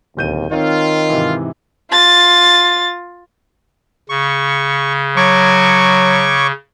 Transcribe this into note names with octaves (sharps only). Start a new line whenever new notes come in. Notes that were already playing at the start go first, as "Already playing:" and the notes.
D1 D#2 G6 D#7
D#3 C4 D#4 F4 C#5
G#2 C3 E3
F4 A6
C#3 C#6
F#3 C#5 C#6 D6